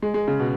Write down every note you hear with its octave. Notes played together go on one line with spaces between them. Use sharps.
G#3
G#3
C#3
B2